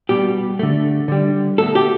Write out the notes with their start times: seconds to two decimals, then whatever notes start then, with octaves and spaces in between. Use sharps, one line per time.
0.09 B2 G3 G4
0.59 D3 A3
1.08 D3 G3
1.58 B2 A3 A4
1.75 G4